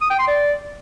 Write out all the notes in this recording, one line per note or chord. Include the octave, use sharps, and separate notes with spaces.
D#6
G5
C6
D5